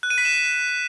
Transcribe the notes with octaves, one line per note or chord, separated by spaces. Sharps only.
F#6
D#7
B6
E7